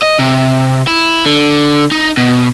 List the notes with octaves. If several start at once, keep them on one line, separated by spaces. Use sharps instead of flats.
D#5
C3
E4
D3
D#4
B2